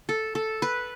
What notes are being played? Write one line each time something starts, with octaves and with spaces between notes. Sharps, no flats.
A4
A4
B4